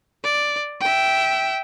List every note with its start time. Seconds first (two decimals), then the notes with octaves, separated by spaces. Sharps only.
0.24 D5
0.81 E5 G5